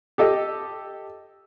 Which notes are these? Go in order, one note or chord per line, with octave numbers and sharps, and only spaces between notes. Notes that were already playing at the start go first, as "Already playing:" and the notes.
G4 A4 D#5